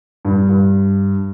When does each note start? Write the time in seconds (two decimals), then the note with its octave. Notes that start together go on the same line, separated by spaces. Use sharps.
0.25 G2
0.49 G2